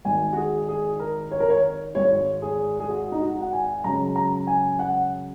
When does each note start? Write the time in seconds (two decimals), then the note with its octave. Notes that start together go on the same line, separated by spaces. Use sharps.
0.05 G#1 G#2 D#3 G#5
0.33 F#4
0.37 G#4
0.68 G#4
1.00 A#4
1.31 C#5
1.40 A#4
1.50 C#5
1.95 G#1 G#2 G#3 C#5
2.42 G#4
2.80 G#4
2.89 F#4
3.12 D#4
3.22 F#4
3.41 F#5
3.53 G#5
3.84 F#2 C#3 G#3 C#4 A#5
4.16 A#5
4.47 G#5
4.79 F#5